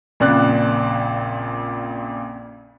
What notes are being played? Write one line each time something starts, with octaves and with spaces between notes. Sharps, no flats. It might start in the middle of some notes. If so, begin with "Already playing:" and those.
A#1 F2 A#2 C#3 D5 F#6